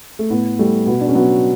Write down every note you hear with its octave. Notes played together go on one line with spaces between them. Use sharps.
A3
A2 B3
G3 A3
B2 B3
D4
C#4
F#3 B3